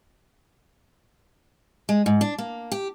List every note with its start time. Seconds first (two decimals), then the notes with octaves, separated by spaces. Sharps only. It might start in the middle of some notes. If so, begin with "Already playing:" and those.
1.89 G#3
2.06 G#2
2.21 D4
2.38 A#3
2.72 G4